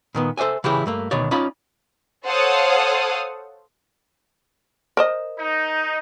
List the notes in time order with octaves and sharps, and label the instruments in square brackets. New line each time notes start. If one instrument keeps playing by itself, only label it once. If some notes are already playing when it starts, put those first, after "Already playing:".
[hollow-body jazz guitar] A#2 D#3 B3
A4 C5 D5 E5 G#5
C#3 E3 E4 G4 G#4
G2 A3 A#3
D2 B2 D#3 C#5 D5
C#4 D#4 F4 D5 F5 B5
[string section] A4 C5 C#5 F5 F#5 D#6
[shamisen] A#4 C5 D#5
[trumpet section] D#4